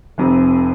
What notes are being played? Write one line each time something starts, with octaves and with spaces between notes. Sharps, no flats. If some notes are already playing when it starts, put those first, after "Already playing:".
F1 F2 C3